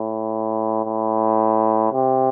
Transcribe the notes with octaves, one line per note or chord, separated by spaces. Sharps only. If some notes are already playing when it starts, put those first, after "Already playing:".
Already playing: A2
A2
C3